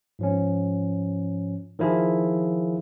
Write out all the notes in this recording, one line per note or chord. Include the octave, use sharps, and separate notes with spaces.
G#2 F3 C#4
D#3 F3 E4 F4 G#4